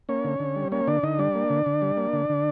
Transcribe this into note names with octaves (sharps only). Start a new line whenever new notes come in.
A#3 C#4 C#5
D3
D3
G3
A#3 C#4 C#5
D3 D4 D5
D3 D#4 D#5
G3 D4 D5
A#3
D3
D3
G3
A#3
D3
D3